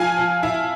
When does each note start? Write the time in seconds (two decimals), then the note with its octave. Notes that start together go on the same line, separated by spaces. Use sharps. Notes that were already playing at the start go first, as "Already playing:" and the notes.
Already playing: F3 F5 G#5
0.17 F3
0.43 E4